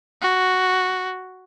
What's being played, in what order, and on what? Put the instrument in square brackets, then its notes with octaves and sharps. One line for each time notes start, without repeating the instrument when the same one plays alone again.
[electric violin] F#4